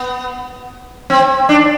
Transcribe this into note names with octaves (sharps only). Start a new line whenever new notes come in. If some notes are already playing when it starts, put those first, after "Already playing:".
Already playing: B3
C4
D4